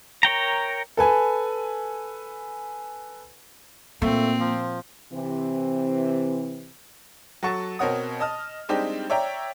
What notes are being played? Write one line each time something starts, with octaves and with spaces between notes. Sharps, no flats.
A#4 C#5 G5 A#5
A4 B4 G#5
A#2 A3 A#3 C4
F3
C3 E3 C4
F#3 A4 F#5 A5 C#6 A6
B2 C4 A#4 C#5 F#5 D#6
D#5 A5 D#6 F6
G3 G#3 C4 D4 D#4 G4
C#5 D5 E5 G5 A#5